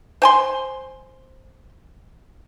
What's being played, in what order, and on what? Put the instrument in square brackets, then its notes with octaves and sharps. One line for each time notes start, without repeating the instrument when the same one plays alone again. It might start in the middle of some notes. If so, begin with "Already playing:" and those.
[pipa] C5 G#5 C6